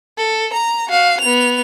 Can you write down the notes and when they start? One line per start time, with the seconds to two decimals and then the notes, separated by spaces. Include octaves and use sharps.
0.18 A4
0.53 A#5
0.88 F#4 F5
1.21 B3 F7